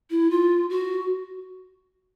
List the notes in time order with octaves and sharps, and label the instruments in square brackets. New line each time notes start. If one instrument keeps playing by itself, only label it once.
[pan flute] E4
F4
F#4